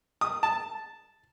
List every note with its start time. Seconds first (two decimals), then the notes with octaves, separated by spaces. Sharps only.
0.21 D#6
0.43 A5